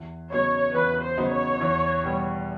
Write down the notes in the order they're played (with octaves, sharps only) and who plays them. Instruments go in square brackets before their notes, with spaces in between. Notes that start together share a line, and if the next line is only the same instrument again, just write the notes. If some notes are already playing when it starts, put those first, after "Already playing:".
Already playing: [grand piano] E2
[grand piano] C#3 F#3 B3 D#4 [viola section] C#5
[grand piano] E2 [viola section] B4
[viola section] C5
[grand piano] C#3 F#3 B3 D#4
[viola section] C#5
[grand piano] E2
B2 G3 B3